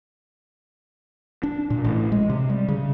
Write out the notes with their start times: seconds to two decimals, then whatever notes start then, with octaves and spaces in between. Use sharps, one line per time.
1.43 D4
1.70 A#2
1.84 A1
2.12 G#3
2.30 C3
2.50 G3
2.68 C#3